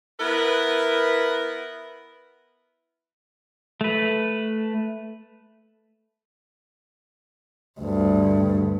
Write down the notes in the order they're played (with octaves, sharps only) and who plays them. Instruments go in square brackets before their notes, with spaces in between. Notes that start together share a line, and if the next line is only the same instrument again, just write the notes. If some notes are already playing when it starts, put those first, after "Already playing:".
[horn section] B3 E4 A#4 B4
[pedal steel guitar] A3 B4
[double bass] D2 G2